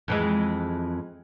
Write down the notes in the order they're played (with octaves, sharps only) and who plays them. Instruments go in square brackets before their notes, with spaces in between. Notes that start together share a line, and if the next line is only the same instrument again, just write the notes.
[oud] F2 E3 G#3